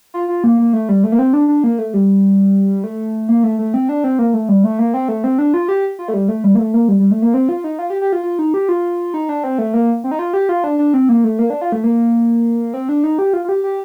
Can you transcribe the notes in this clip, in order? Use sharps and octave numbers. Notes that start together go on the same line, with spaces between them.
F4
F4
A#3
A#3
A3
G3
A3
A#3
C4
D4
D4
A#3
A3
G3
A3
A#3
A3
A3
C4
D4
C4
A#3
A3
G3
A3
A#3
C4
A3
C4
D4
F4
G4
F4
A3
G3
A3
G3
A#3
A3
A#3
G3
G3
A3
A#3
C4
F4
D#4
F4
G4
G4
F4
F4
D#4
G4
F4
D#4
D4
C4
A3
A#3
C4
D#4
F4
G4
F4
D4
D4
C4
A#3
A3
A#3
D4
F4
A3
A#3
C4
D4
D#4
G4
F4
F4
G4
G4